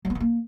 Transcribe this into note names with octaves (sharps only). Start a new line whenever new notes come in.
F#3
B3
D#3
A#3